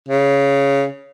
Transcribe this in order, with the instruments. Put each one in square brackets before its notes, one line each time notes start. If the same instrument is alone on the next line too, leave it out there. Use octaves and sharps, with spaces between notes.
[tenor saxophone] C#3